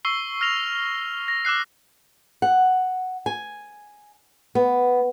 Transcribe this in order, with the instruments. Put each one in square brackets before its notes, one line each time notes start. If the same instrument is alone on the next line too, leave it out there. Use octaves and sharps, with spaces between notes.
[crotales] C#6 E6 C7 G7
F6 A#6 F7
A#6
D6 E6 F#6 C7
[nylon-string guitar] F#5
G#5
B3